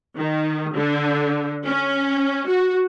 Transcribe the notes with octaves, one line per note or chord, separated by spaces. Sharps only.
D#3
D3
C#4
F#4